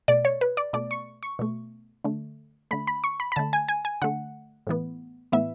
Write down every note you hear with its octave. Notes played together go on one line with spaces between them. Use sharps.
B2 A3 D5
C#5
B4
D5
B2 A3 D5
C#6
C#6
B2 A3
D3 A3
D3 A3 B5
B5
C#6
B5
B5
D3 A3 A5
G#5
G#5
G#5
D3 A3 F#5
A2 E3 B3
A2 E3 B3 E5